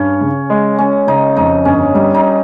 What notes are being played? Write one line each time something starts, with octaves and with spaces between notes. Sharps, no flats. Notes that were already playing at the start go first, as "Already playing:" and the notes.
Already playing: G2 C#4
C#3
G#3
G#3 C#4
C#3 D#4
F2 D#4
G1 C#4
G3 D#4
D#4